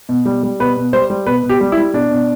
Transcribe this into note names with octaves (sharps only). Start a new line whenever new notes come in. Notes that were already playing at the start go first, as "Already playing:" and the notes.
B2
G3
G3
B2 B4
B2
G3 C5
G3
B2 B4
B2
G4
G3
E4
G3
B2 D4
B2